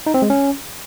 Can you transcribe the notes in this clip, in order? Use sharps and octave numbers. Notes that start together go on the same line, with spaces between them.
D#4
C4
G#3
C#4